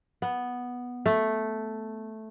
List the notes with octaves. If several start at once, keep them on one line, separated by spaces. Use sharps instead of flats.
B3
A3